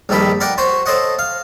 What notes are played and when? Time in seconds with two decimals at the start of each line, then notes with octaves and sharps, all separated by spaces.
0.09 A#1 G2 D#3 A4 B5
0.40 A#4 D5 F#5 G5
0.58 F#4 C5 C#5
0.86 A4 C5 C#5 D#5 F#5
1.19 F5